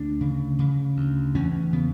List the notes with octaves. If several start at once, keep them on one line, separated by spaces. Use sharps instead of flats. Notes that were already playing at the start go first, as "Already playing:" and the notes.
Already playing: D2 D4
C#3
C#3
D2
E2 C#4
C#3 B3